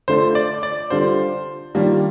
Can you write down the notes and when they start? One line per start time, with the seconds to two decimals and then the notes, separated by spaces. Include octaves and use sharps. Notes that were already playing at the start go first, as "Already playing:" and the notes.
0.08 D3 A3 D4 F4 C5
0.35 D5
0.63 D5
0.90 D3 G3 D4 F4 C5
1.75 D#3 G3 A#3 D4 F4